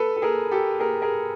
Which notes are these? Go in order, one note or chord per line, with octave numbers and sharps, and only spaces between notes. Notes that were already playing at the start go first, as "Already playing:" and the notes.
Already playing: A4 B4
A4
G#4 A#4
G4 A4
G#4 A#4
G#4 A#4